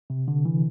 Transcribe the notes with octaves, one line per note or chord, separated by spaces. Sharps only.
C3
D3
E3